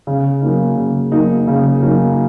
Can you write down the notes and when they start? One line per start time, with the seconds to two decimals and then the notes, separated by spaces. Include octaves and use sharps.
0.07 C#3
0.41 F#3 A#3 D#4
0.76 C#3
1.12 F#3 A#3 D#4
1.47 C#3
1.82 F#3 A#3 D#4